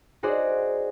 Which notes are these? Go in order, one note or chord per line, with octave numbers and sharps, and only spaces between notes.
D#4 F#4 G#4 C5 D5